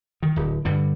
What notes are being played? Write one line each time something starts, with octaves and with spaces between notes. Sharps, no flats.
D#3
D1
G2 D3 G3